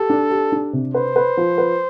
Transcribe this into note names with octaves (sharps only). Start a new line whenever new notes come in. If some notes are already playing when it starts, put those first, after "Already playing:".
Already playing: G4 A4
D4
G4
D4
C3
B4 C5
B4
F3
B4